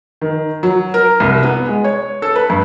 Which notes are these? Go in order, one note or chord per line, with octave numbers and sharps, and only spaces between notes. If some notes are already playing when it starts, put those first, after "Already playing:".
D#3
F#3
A#4
C2
B3
G#3
C#5
A4
B4
G2